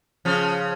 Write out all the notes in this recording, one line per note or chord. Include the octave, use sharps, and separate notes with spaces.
C#3 F3